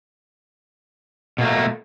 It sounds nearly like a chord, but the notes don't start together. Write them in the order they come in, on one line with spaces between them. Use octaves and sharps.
B2 A#3 A3